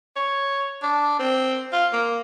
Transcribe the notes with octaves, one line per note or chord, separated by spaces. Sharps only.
C#5
D4
C4
F4
A#3